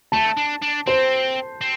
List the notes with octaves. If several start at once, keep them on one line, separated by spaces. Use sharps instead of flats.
A3 A5
D4
D4
C4 C5
C4